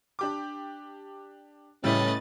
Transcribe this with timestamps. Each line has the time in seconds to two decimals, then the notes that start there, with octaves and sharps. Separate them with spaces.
0.19 D4 G4 D6
1.84 A2 C#3 G3 C#4 E4 B4 D#5 A6